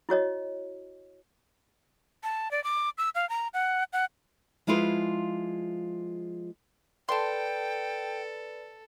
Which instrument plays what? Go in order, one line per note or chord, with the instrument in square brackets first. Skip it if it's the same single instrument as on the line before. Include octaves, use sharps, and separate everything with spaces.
[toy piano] E4 F#4 C#5 D#5
[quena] A5
D5
D6
E6
F5
A#5
F#5
F#5
[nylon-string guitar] F3 G#3 E4 F4 G#4 B4
[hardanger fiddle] A4 [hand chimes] B4 D5 B5 [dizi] G5 [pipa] A5 C6